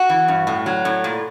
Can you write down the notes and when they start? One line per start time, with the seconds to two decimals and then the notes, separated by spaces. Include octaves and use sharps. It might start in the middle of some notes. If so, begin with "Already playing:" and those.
Already playing: F#4
0.09 E3
0.28 G2
0.47 A2
0.66 F#3
0.85 A2
1.04 A#2